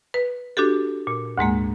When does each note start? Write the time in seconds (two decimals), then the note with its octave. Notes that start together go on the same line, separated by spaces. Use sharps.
0.14 B4
0.57 D4 F#4 G4 A4
1.07 A#2
1.38 D2 G#2 G#3 A#3